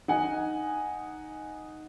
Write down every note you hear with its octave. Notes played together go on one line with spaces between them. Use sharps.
D#4 F#5 G#5